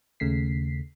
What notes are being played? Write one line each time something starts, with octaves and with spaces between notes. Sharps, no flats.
D#2 C#3 A3 B6 C7